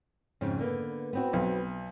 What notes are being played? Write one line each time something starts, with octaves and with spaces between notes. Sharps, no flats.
F2 G#2 C#3
D3 A#3 B3
B3 C4 F#4
B1